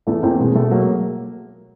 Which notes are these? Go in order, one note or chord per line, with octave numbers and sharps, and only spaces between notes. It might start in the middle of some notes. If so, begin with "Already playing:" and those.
E2 A3 B3
E2 A#3 C4
B2 G#3
B2 A3
F#3 G#3 A#3